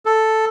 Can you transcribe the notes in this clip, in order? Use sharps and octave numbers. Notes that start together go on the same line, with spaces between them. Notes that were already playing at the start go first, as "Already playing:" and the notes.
A4